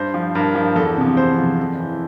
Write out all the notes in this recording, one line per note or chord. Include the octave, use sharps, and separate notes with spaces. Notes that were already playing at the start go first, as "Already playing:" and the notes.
Already playing: G2 C5
F3
G2 A#4
F3
E2 A4
C3 F3
E2 C5
C3 F3
F2
E3